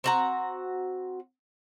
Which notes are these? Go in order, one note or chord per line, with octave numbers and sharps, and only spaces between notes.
C4 F#4 A#5